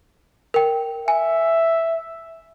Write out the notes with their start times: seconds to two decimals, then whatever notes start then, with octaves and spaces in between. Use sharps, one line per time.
0.54 A#4 G5
1.08 E5 G#5